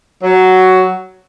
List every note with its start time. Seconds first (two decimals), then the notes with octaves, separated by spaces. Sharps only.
0.23 F#3